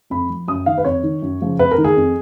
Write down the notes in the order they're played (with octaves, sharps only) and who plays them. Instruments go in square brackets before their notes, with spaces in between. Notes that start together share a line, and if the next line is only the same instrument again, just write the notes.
[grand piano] F2 B5
F3
F#2 D#6
D#3 F5
B4
F2 C#5
D#3
F#2
C#3 F3
F2 B4
A#4
D#3
G#4
F2